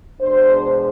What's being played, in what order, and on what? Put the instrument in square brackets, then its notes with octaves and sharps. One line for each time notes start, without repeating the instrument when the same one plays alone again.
[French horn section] B2 G#3 D4 C5